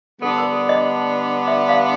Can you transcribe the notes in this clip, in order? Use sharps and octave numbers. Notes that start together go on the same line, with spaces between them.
D3 G3 B3 D4 A4
A#4
A4
D#5
E5
F5